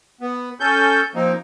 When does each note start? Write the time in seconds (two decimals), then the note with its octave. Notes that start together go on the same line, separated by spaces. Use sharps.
0.21 B3
0.60 C#4 A4 G6
1.15 F3 A#3 C4 D#4